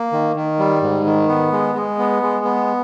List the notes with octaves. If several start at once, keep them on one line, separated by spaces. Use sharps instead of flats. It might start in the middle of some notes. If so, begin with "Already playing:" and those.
Already playing: A#3
D#3
D#3
G3
G#2
D#3
B3
G#3
G#3
B3
G#3
B3